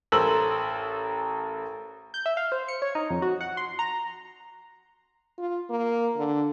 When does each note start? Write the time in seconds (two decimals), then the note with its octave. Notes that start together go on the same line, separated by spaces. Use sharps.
0.12 A1 A4 A#4 C5 E6 F#7
2.14 G6
2.26 E5
2.37 F5
2.52 C5
2.68 C#7
2.82 C#5
2.95 D#4
3.10 F2
3.22 F#4
3.41 F#5
3.57 C6
3.79 A#5
5.39 F4
5.70 A#3
6.17 D3